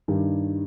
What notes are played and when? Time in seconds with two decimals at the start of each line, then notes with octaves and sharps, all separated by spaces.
0.08 G2 D#3 G3